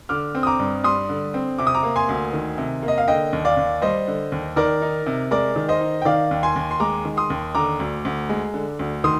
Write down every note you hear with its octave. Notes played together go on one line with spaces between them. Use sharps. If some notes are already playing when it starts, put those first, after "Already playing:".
D3 D6 F6
C4
D#6
A#5 D6
G2
G3 C6 D#6
D3
C4
C3 D6
D#6
A#5 D6
A#3
G#5 C6
D2
D#3
C3
A#3
D#5
F5
D3 D#5 G5
D#2
D5 F5
D#2
G3 C5 D#5
D3
D#2
D#3 A#4 D5
D#4
C3
G#3 A#4 D5
D#3
C5 D#5
D#4
G5
D#3 D5 F5
D#2
G#5 C6
D#2
C6
G#3 A#5 D6
D#3
C6 D#6
D#2
D3 A#5 D6
D2
D2
G#3
D3
D2
D#3 C6 D#6